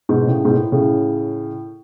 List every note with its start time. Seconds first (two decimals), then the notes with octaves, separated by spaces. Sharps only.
0.09 G#2 B2
0.27 A2 C#3
0.45 G#2 B2
0.54 A2
0.72 A2 C#3